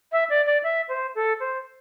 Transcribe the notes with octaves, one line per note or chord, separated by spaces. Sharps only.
E5
D5
D5
E5
C5
A4
C5